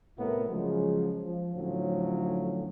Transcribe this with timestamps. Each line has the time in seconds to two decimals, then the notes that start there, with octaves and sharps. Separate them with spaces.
0.19 C2 A2 B3 E4 A#4
0.49 C#3 F3 F#3 G#3
1.24 F3
1.55 A2 D3 F3 F#3 C#4